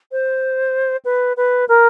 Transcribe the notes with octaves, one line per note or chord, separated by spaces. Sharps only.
C5
B4
B4
A#4